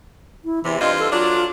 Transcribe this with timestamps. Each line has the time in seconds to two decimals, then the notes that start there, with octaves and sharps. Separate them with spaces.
0.45 E4
0.63 E2 C3 E3
0.80 G2 C4 F4 D#5
0.99 A4
1.12 F#3 D4 F4